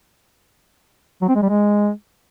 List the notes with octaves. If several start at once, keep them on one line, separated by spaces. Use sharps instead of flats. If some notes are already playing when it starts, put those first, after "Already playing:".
F#3
C4
G#3
G3
G#3